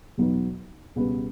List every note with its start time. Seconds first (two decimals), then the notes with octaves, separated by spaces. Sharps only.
0.17 E2 B2 F#3 B3 D#4
0.96 C#2 B2 G3 B3